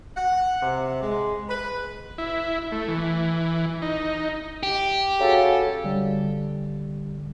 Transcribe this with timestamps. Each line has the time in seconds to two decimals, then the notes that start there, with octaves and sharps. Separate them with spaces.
0.16 F#5
0.61 C3
1.02 G#3
1.49 B4
2.18 E4
2.72 A3
2.88 E3
3.82 D#4
4.63 G4
5.20 C#3 F#4 G#4 A4
5.84 D3 G3